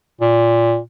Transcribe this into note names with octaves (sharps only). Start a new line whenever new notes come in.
A#2